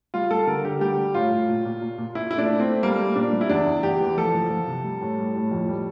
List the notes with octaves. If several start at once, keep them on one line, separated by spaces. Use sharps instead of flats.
G3 F4
G3 A4
D3 A#4
D3 G4
G3 G4
G3
A2 F4
A2
A#2
A#2
A#2
A#2
A#2 E4
A3 E4
D4
A3
C4
A3
G3 A#3
G3
A#2 D4
G3
E4
E2 D4
E2
E2 G4
E3
F3 A4
F3
F3
C3
G3
A2
G3
A2
F2
G3